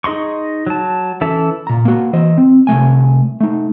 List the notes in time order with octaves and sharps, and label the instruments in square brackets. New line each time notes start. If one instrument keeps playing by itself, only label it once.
[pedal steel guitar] D#4 G#4 D#5 C6 C#6
F#3 A5
E3 C#4 A4 E5 A5
[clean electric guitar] A#2 A#5
A#3 F#4
E3 C5 D#5
C4
C2 F3 A3 G#5
A3 D#4